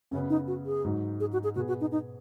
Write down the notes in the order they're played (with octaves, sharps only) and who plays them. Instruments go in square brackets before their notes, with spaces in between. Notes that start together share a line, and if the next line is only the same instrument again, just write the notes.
[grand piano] F#2 C#3 B3 [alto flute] C#4
[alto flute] D#4
F#4
G#4
[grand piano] G#2 F#3 D#4
[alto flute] G#4
F#4
G#4
[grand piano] B2 B3 G#4 [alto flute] F#4
[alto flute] F#4
D#4
D#4